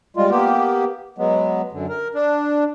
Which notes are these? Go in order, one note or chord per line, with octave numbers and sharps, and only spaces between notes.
G3 G#3 F4
A#3 B3 G4
F#3 G#3 B3
F#2 D3
A#4
D4